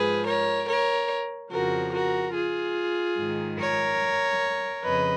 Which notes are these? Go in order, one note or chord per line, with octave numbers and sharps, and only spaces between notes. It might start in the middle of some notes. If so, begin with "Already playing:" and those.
Already playing: G#2 F3 G#4 B4
A#4 C#5
A#4 C#5
F2 C#3 F3 F#4 A#4
F#4 A#4
F4 G#4
G#2 D#3
A#4 C#5
F2 C#3 B4 D#5